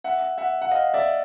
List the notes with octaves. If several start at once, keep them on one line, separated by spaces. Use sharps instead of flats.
E5 F#5
E5 F#5
F#5
D#5 F5
D5 E5